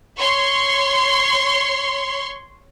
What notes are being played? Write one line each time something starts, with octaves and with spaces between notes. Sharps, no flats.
C#5 C6 C#6